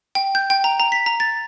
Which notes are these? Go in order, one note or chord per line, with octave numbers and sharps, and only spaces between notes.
G5
G6
G5
A#5
A#5
B6
A#5
A6